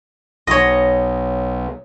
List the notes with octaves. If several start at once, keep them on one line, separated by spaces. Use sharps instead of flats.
B1 C#5 D#5